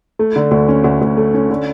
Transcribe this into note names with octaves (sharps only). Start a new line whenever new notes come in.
A3
D3
D2
C#4
D2
D2
A3
C#4
D3